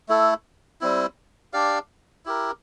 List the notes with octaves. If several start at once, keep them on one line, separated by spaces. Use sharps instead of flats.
A3 E4 A4
G3 C4 E4
D4 G4 D5 F5
E4 G4 A#4